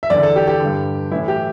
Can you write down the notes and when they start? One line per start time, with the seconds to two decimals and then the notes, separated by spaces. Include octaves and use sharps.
0.03 E5
0.10 E2 D3 D5
0.23 A4
0.36 G4
0.47 G4
0.60 G2 D3
1.11 A2 E3 E4
1.28 G4